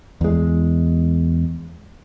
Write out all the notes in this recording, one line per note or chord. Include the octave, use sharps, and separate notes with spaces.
E2 G#3